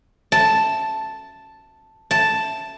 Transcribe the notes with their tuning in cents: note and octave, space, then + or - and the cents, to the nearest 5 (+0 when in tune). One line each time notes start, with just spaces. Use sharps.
A5 +0
A5 +0